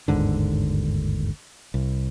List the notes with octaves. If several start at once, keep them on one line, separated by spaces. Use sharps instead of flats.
G1 D#2 G#2 D3
C2